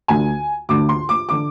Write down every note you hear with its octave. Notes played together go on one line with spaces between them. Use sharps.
D2 D3 G#5
D2 D3 D6
C6
D6
D3 D6